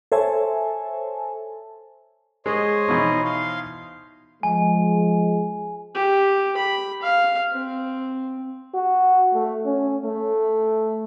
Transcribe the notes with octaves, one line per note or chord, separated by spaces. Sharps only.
A4 C5 C#5 E5 G#5 A5
G#3 C5 C#5 D#5
B2 E3 D#4
F5 C6
F3 G#3 G#5
G4
B5
F5
C4
F#4
A3
C#4
A3